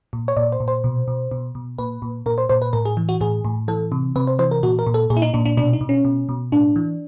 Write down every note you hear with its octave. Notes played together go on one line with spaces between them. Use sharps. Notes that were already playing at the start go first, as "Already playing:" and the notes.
A#2
C#5
A#2 D5
C5
A#2
C5
B2
B2
B2
B2
A#2 B4
A#2
A#2 A#4
C5
A#2 C5
B4
A2 A#4
G#4
E3
F#4
A2 G#4
A2
E3 A4
C3
C3 B4
C5
E3 C5
A#4
A#2 F#4
A#4
A#2
A4
A#2 G#4
E4
D#4
A#2 D4
D4
B2 D4
D#4
B2
C#4
B2
B2
A2 D4
E3